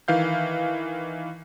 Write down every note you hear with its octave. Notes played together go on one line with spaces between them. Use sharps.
D#3 E3 F5 G6